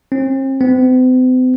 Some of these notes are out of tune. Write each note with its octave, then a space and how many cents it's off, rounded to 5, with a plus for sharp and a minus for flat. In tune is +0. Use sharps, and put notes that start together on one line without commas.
C4 +40
C4 -45